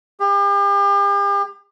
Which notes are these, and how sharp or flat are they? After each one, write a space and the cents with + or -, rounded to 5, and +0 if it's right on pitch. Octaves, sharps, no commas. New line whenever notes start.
G4 +40